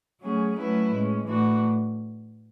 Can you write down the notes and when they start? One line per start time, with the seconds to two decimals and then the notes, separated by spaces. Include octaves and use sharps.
0.21 F#3 A3 C#4 G#4
0.56 F#3 A3 C#4 E4 B4
0.91 A2 G#3 C#4
1.26 A2 E3 A3 D4 F#4